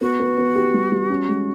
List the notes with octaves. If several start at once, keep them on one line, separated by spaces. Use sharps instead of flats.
B3 F#4
B3
B3
G4
G3
G3
C#4
G#3